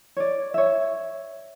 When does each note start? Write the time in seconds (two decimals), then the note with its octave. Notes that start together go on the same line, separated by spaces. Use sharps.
0.16 C#5 D5
0.54 C#5 E5